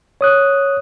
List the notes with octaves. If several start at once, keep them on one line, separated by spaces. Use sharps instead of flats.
C#5 D#6 F#6